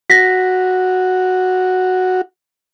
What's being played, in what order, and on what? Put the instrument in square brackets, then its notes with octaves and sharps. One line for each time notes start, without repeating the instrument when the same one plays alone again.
[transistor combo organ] F#4 [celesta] A#6 B6